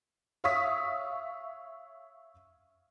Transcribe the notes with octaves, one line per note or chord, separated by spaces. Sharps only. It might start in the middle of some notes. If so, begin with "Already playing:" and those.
C#5 E5 F5 C#6 D#6 B6